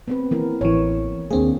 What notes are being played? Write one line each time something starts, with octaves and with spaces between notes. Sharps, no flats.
B3 C4 B4
E3 A#3 A#4
A1 E3 C#5
D#2 A#3 C4 D4 G#4